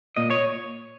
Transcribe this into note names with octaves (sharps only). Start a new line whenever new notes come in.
A#2 D#5
C#5